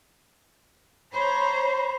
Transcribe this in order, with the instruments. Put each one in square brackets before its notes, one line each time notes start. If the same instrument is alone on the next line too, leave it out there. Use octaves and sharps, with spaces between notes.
[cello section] C5 [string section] C#5 A#5 [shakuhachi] B5